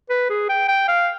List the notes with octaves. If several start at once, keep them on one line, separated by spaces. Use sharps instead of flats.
B4
G#4
G5
G5
F5